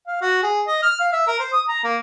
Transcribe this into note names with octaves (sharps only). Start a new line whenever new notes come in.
F5
F#4
G#4
D#5
F6
F5
E5
A#4
C5
D#6
A#5
A#3